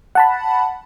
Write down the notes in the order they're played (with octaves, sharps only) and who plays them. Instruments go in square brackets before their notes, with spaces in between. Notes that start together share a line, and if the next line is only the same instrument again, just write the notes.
[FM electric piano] F#5 A5 B5